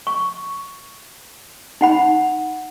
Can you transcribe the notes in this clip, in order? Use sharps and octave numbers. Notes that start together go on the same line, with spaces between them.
C#6
D#4 F#5 B5